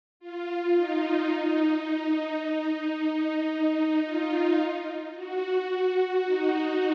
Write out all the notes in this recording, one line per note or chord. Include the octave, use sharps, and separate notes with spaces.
F4
D#4
D#4
F4
F#4
D#4